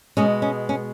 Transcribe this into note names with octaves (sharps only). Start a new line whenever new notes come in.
B2 G#3 B3 C#4
C#4
C#4